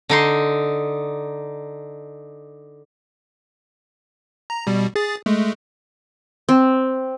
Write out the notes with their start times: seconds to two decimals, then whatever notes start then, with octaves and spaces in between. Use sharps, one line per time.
0.09 D3 D#4 C6
4.50 A#5
4.67 B2 G3
4.96 G#4 A6
5.26 G#3 A3
6.49 C4